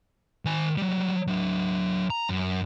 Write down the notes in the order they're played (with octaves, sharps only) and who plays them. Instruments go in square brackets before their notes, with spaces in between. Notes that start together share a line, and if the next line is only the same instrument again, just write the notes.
[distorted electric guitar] D#3 G#5
F#3 G3
F#3 D4
A#5
F#2